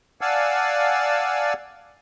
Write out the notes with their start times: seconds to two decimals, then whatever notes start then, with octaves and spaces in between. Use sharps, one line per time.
0.21 D5 F5 F#5 G#5 A5 E6